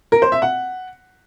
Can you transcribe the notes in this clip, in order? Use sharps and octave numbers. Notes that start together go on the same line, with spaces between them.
A#4
C5
E5
F#5